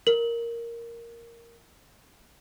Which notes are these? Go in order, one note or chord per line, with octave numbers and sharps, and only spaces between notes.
A#4 F#7